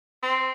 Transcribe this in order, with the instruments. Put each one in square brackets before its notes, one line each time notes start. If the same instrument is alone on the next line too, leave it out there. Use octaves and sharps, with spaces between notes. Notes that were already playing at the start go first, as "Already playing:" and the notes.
[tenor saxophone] C4